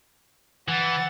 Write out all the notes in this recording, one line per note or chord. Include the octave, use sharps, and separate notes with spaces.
E3 F#5 A6